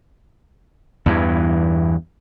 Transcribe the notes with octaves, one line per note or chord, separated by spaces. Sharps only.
E2 G2 E3